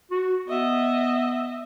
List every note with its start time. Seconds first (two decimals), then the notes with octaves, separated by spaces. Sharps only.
0.11 F#4
0.48 B3 D#5 E5